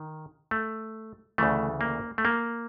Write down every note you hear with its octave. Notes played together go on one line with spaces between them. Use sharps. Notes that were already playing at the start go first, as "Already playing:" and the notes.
Already playing: D#3
A3
D2 C#3 E3 A3
A#3
A3
A#3